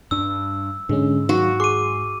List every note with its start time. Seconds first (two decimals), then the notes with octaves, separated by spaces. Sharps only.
0.11 G2 D4 E6
0.89 G#2 D3 G#3 C#4
1.29 D#3 F#3 F#4
1.60 G#4 C6 D6 D#7